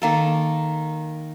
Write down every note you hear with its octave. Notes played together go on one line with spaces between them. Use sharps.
D#3 A#3 A4